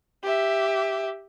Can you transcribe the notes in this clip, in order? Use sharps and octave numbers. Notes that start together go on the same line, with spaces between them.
G4 E5